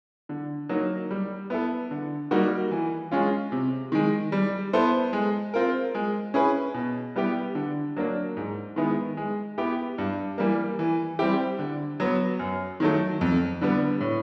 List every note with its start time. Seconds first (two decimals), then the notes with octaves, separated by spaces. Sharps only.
0.29 D3
0.69 F#3 A#3 D#4
1.11 G3
1.50 B3 E4 A4
1.91 D3
2.31 G3 A#3 D#4 F#4
2.71 E3
3.12 G#3 C#4 F4
3.52 C3
3.92 D#3 G#3
4.32 G3
4.73 B3 E4 A4 C5
5.13 G#3
5.54 C4 F4 A#4
5.95 G#3
6.34 C#4 E4 G#4 B4
6.74 B2
7.16 G3 B3 E4 G4
7.55 D3
7.96 F#3 A#3 D4
8.37 G#2
8.76 D#3 G#3 B3 E4
9.17 G#3
9.58 B3 E4 G4
9.98 G2
10.38 E3 G3 A#3
10.79 E3
11.19 G3 C4 E4 G4
11.59 D3
12.00 F#3 B3
12.39 F#2
12.80 D#3 F#3 A3
13.21 F2
13.61 D3 G3 B3
14.01 A2